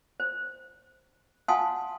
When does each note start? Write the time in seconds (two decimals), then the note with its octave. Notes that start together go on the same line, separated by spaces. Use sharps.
0.20 C5
1.48 F5 F#5 G#5 A5 C6 D#6